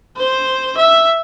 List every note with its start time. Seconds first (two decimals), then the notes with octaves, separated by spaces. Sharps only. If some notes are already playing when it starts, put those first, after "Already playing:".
0.18 C5
0.77 E5